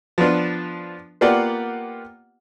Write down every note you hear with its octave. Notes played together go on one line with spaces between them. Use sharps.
F3 B3 D4 F4
A#3 B3 F4 G4 D5 F#5